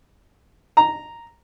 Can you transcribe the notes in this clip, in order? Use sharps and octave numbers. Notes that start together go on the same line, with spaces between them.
A#5